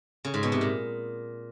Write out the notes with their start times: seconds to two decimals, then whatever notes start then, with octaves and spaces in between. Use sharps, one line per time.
0.25 C#3
0.34 G#2
0.43 B2
0.52 C3
0.61 A#2